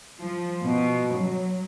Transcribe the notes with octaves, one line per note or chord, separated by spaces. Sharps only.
F3
B2
F#3